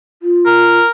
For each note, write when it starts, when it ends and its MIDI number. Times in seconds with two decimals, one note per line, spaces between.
0.22 0.79 65
0.46 0.91 70